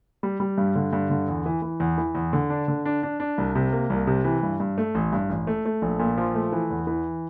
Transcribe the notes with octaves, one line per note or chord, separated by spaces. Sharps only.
G3
G3
G2
D3
G2
D3
E2
E3
E3
E2
E3
E2
D3
D4
D3
D4
D4
D4
C2
C3
A#3
C2
C3
E3
G2
G2
A3
A1
G2
A1
A3
A3
A#1
A#2
F3
A3
E3
E2
E3